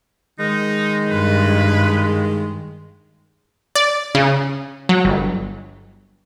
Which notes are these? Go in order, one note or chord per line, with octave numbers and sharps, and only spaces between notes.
D#3 G#3 D#4
G2 B4
D5
C#3
F#3
G1